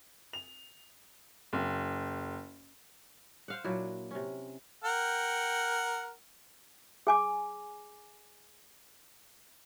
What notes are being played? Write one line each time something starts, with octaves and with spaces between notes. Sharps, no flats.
F7
F#1
C5 F5 F#5
A#2 F#3 D4 E4
C3 C#4
A#4 F#5 G5
G#4 G#5 D6